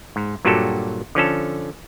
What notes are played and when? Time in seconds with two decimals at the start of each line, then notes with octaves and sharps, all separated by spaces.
0.16 G#2
0.45 G2 A#2 F#3 F#4 G4 A4
1.15 D3 F3 C#4 A4